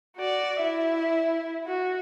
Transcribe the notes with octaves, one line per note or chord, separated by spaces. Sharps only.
F#4 D5
E4 E5
F#4